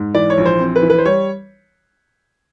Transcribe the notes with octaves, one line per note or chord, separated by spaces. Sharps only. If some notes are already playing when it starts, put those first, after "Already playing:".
Already playing: G#2
E3 D5
C#5
A#1
C5
C4
B4
E3
B4
C5
G3 C#5